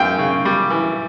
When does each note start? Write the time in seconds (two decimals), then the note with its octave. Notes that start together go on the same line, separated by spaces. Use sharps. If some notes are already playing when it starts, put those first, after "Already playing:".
Already playing: F#2 E3 F5 G5
0.19 C#3
0.45 G3
0.70 E3